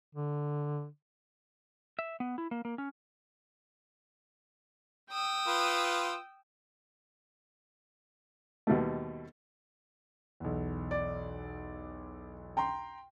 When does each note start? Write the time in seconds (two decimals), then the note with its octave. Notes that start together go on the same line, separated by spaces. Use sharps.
0.15 D3
1.99 E5
2.20 B3
2.38 E4
2.51 A#3
2.65 A#3
2.78 C#4
5.11 G5 D#6 E6
5.47 F4 B4
8.67 D#2 B2 G3 A3
10.40 B1 E2
10.91 D5
12.57 G5 A#5 C6